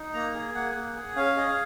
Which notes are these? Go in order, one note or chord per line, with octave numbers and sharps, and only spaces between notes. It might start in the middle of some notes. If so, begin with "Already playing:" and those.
Already playing: D#4
A#3 A#5
G#4
A#3 F#5
A#3
G#4
C#4 F5
G#4 D#5
F5